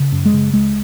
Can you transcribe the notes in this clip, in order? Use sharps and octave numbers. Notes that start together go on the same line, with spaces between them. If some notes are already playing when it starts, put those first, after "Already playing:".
Already playing: C#3
F#2
G#3
C#3
C#2 G#3